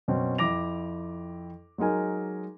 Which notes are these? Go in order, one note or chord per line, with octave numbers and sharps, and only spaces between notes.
F#2 B2 C4 C#4
F2 E4 D6 A#6 F7
F#3 G#3 D#4 A#4 G#5